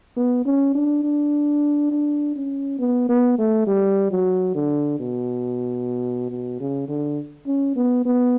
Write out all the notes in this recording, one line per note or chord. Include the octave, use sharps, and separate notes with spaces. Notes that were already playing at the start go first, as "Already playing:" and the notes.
B3
C#4
D4
D4
D4
C#4
B3
B3
A3
G3
F#3
D3
B2
B2
C#3
D3
C#4
B3
B3